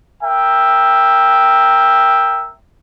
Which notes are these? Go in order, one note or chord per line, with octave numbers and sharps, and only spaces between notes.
A#4 E5 G5